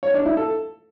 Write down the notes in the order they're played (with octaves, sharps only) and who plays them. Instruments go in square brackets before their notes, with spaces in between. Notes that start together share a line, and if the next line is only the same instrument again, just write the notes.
[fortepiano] C#5
D4
E4
A4